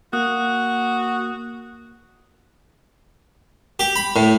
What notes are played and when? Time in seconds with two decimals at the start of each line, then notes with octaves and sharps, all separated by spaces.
0.13 A#3 F#4 D#6 F#6
3.79 G4
3.96 B5
4.16 A2